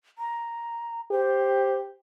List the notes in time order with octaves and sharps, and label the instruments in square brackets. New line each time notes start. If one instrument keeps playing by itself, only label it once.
[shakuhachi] A#5
[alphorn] G4 [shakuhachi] C5